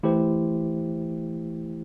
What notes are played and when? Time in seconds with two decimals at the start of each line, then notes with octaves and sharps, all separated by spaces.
0.03 E3 A3 E4 G4 C5